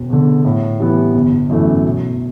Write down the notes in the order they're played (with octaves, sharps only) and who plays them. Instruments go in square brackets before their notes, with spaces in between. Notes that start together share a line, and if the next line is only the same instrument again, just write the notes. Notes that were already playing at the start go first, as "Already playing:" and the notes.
Already playing: [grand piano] E1
E2 D3
A2
E3 G3 B3
G1
F#2 E3 A3
B1